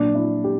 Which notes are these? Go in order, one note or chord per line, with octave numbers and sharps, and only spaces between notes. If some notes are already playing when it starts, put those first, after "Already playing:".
Already playing: A#2 F#3 D4
E4
G4